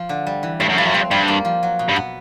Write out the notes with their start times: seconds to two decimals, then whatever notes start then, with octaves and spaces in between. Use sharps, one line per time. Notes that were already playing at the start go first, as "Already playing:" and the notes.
Already playing: F3
0.09 D3
0.27 G3
0.43 E3
0.60 G2 A3
0.69 F#2
0.77 G2 F3
0.86 F#2
0.94 G2 C4
1.11 G2 G3
1.28 A#3
1.45 F3
1.63 F#3
1.79 B2
1.89 G2
1.96 B3